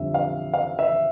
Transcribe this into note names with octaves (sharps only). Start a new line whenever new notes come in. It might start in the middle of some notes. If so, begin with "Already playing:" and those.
Already playing: F2 D3 G3 E5
F5
F5
E5